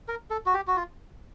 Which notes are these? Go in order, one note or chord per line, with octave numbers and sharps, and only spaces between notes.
A#4
A4
F#4
G4
F#4
F4